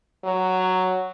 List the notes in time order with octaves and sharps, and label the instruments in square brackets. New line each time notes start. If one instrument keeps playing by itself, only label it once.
[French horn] F#3